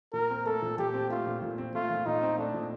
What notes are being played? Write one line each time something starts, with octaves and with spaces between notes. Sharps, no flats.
A#2 A#4
C4
A3 A4
A#2
A#2 G4
C4
A3 F4
A#2
A#2
C4
A3 F4
A#2
A#2 D#4
C4
A3 D4
A#2